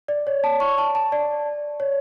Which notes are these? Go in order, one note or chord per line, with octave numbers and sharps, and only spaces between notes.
D5
C#5
A5
C#6
A5
A5
D5
C#5